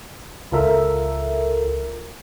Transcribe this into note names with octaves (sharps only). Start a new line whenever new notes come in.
C#2 F4 A4 A#4 E5